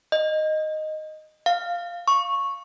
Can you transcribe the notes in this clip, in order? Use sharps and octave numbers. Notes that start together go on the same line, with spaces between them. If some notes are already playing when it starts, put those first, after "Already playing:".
D#5
F5
C#6